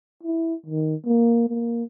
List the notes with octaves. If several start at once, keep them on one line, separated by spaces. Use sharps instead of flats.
E4
D#3
A#3
A#3